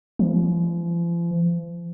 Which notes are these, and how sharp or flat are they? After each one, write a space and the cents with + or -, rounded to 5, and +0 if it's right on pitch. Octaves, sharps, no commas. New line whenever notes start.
F3 -40